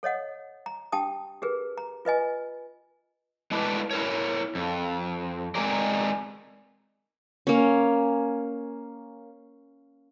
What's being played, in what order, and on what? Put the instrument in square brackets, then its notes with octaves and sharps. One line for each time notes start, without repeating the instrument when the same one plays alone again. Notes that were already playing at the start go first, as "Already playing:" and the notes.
[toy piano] A4 C#5 D#5 F#5
A#5
D4 G4 G5 A5 D#6
G4 G#4 A#4 B4
A#5
F4 B4 D#5 G#5
[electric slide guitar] G#3 A3 D4 E4 B4
E4 A#4 C#5
F2
G#3 C4 D#4 G#4 A#4 D5
[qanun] A#3 C#4